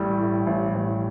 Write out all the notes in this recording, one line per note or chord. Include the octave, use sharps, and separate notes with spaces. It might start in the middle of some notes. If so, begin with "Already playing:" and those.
Already playing: A1 A2 G3
A2
A1
A1